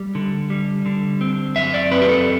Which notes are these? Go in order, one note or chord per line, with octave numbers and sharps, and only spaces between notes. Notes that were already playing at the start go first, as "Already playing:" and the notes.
Already playing: G3
D3
G3
D3
C4
F#2 E5
D5
C4 B4
G4
A4